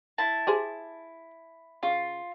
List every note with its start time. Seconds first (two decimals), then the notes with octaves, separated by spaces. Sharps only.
0.18 E4 A5
0.47 G4 G#4 C5
1.83 C#3 F4